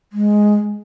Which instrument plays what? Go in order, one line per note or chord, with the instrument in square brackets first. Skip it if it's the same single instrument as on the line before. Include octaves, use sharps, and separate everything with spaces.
[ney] G#3